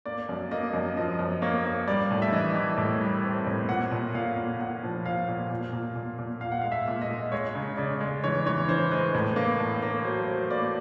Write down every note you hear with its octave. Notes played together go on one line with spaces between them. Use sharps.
A#3 D5
F#2
A#3 D#5
F#2
F3 D#5
F#2
A#3 C#5
A#3
G3 D5
A2
E5
E3 D#5
E3
A2
G3
C4
A2
A#2 F#5
A#2
A#2 F5
A#2
A#2 F#5
F3
A#2 F5
A#2
A#2
A#2
A#2
A#2
A#2 F5
F#5
G#3 F5
E5
A#2
D#5
G#3
G#3 C#5
C#3
C#3 D5
G#3
E3 C#5
E3 C#5
E3 C5
G#3 B4
A2
A#3
A2
A#3
F#3 C5
F#3
A#3 D5